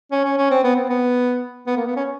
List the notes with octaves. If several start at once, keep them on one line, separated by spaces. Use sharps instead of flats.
C#4
C#4
C#4
C4
B3
C4
B3
B3
A#3
B3
C#4